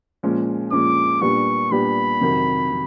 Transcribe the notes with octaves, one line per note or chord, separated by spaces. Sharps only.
A#2 F3 G#3 C#4
A#2 F3 G#3 C#4 D6
A#2 G3 B3 D4 G4 C#6
A#2 G3 B3 D4 G4 B5
F2 C3 D#3 F#3
C3